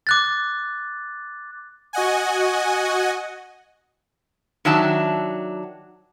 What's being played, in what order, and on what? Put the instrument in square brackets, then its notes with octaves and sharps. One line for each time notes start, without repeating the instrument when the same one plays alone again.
[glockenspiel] D6 F#6 A6
[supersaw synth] F#4 D#5 F#5 G#5
[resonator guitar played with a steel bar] D#3 F#3 D4 E5 A5